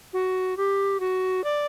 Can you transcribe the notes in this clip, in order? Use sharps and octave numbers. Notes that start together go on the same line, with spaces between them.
F#4
G4
F#4
D5